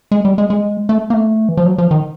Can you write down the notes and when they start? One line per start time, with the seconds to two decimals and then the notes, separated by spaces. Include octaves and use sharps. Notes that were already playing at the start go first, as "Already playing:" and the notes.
0.11 G#3
0.25 G3
0.38 G#3
0.50 G#3
0.89 A3
1.10 A#3
1.14 A3
1.49 E3
1.57 F3
1.66 F#3
1.78 F3
1.91 D#3